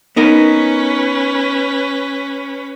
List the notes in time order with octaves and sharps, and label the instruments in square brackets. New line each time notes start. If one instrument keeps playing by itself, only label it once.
[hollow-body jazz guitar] B3 D#4 A#4 [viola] C#4 B4